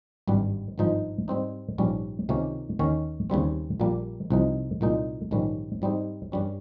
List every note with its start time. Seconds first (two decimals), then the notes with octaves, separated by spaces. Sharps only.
0.27 G#1 G2 G3
0.78 G#1 G2 F3 G#3 D#4
1.28 G#2 G3 C4 D#4
1.78 A#1 G#2 G3 C#4
2.29 C#2 C3 D#3 A#3 C#4
2.79 D#2 D#3 A#3 C#4
3.30 D#2 C#3 G3 C4
3.80 A#1 A#2 G3 A#3
4.30 C2 C3 F3 G#3 D#4
4.81 C2 A#2 G#3 D#4
5.31 A#1 G#2 D#3 G3 C#4
5.82 G#2 G3 C4 D#4
6.32 G2 G3 C#4